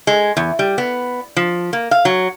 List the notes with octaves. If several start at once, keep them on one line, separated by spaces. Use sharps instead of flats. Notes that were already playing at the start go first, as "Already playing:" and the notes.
G#3
E2
G3
B3
F3
A#3
F5
F#3